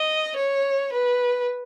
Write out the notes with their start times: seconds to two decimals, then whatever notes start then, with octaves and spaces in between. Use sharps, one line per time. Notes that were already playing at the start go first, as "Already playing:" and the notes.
Already playing: D#5
0.37 C#5
0.93 B4